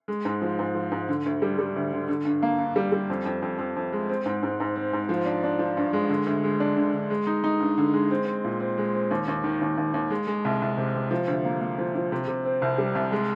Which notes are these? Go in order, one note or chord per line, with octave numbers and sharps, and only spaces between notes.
G#3
G#2
F3
G#2
F3
G#2
D3
D2
G3
G3
D2
D3
D3
G2
A#3
G2
G3
G3
F2
F2
F2
F2
F2
G#3
C4
G#2
G#2
G#2
C4
G#2
F3
D4
D4
F3
G2
G#3
D3
D2
G#3
D4
D3
D3
G#3
D#4
D#4
G2
D3
G#3
C4
C4
A#2
C4
G#3
C4
D#2
D#2
D#3
D#2
D#2
D#2
G#3
G#3
C2
C2
C3
C3
F3
D2
A#3
A#3
F3
F3
C3
C3
C4
C2
G3
C2
G#3